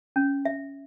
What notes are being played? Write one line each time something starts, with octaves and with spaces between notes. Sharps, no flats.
C#4
E5